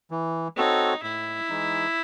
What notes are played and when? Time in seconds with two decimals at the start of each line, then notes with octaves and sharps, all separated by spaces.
0.11 E3
0.57 C4 D#4 F#4 A4 C#5
1.03 A2 E4
1.49 E3 G#3 D#4